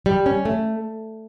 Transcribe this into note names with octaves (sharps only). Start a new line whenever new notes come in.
G3
C#4
A3